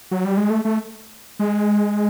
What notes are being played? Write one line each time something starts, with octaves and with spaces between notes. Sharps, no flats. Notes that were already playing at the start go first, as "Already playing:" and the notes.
F#3
G3
G#3
A3
A3
G#3